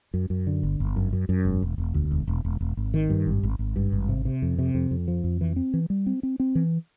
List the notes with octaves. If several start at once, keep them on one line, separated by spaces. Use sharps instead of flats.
F#2
F#2
D3
G1
G1
F#2
F#2
F#2
E1
E1
E1
D2
E1
E1
E1
E1
G#1
D#3
G2
G#1
G#1
G#1
G2
G#1
C3
C3
F2
C3
F2
F2
F3
F2
E3
C4
E3
G3
C4
C4
C4
E3